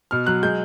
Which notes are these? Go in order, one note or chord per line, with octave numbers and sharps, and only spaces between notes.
B2 F6
F#3 F#6
G#3 G6